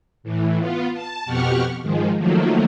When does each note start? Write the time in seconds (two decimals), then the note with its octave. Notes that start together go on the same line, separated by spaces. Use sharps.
0.23 A2 E3
0.58 B3 F4
0.94 A5
1.26 F2 B2 G4 F#5 C#6 F6
1.82 G#2 D#3 F3 G#3
2.18 D#3 F3 F#3 A3 A#3